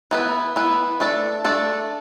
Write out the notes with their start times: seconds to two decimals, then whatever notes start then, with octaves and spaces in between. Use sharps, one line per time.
0.11 E3 B3 E4 B4
0.56 E3 B3 E4 B4
1.00 A3 D4 A4 D5
1.44 A3 D4 A4 D5